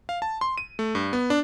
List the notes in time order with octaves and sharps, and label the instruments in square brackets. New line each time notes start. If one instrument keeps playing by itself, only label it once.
[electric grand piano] F5
A5
C6
D#7
A3
G2
B3
D4